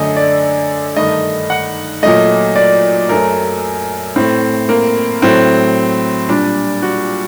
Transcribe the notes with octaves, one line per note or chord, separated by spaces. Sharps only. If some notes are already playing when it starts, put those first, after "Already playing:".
Already playing: F#2 D3 A3 D#5
D5
G2 D#3 A3 D#5
F#5
A#2 F#3 A3 D#5
D5
F#2 F#3 A3 A#4
A2 A3 C4
A#3
A2 F#3 A3 C4
A#2 G3 D4
F#4